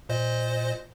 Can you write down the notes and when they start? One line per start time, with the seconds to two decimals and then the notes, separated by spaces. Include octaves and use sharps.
0.09 A#2 C5 D#5